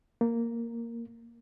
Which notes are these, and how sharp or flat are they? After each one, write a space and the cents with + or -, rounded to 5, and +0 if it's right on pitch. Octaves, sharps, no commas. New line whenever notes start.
A#3 -5